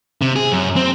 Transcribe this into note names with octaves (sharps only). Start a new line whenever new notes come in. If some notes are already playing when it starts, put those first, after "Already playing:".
C3
G#4
F#2
C4